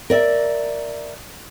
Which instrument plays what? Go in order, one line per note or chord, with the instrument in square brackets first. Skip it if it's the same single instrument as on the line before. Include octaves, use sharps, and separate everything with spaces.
[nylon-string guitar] A#4 D5 E5